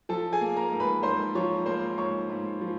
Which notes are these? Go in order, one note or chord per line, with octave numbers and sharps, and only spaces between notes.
F3 A4 A5
G#4 G#5
A#3
A#4 A#5
G#2
B4 B5
G#2 C5 C6
F3 C#5 C#6
A#3 C5 C6
G#2 C#5 C#6
G#2
F3